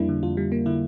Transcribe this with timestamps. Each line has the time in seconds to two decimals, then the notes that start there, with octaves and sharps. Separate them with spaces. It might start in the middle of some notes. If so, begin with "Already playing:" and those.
Already playing: F2 G3 A#3 D4 E4
0.09 D3
0.23 F2 F4
0.37 G3
0.52 A#3
0.66 D3 E4